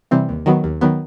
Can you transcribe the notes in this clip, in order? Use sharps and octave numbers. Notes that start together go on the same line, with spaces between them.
C3 E3 G3 C4
D#2
D#3 F#3 B3
D#2
D#3 F#3 B3